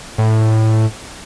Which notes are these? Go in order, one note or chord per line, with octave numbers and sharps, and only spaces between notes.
A2